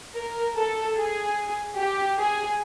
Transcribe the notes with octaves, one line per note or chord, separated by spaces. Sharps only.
A#4
A4
G#4
G4
G#4